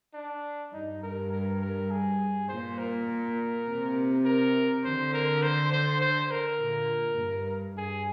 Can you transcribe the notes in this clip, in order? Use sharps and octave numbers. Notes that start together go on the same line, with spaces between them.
D4
G2 D#4
A#4
A#4
A#4
G#4
A#2 C5
A#4
C3
A#4
D3 C5
A#4
C5
C5
C5
A#4
A#2
G2
G2 G#4